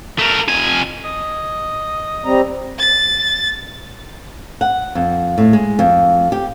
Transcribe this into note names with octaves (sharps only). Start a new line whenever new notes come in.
A3 A#4
F2 G#5
D#5
G3 C4 A#5
A6
F#5
F2
A2
G#3
F2
G4